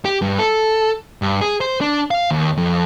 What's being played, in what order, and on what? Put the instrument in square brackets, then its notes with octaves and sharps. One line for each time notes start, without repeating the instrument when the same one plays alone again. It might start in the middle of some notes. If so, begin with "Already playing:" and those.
[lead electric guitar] G4
G2
A4
G2
G#4
C5
D4
F5
D#2
F2